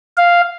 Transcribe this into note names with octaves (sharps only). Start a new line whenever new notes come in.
F5